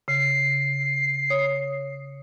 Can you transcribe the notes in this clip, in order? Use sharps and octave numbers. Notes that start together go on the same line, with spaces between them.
C#3 C7
C#5 D#6